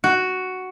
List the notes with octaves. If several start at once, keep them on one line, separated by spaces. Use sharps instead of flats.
F#4